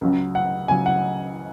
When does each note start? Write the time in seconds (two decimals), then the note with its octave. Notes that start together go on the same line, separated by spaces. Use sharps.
0.01 C#2 C#3 F#3
0.35 F#5
0.68 C#2 C#3 F#3 G#5
0.86 F#5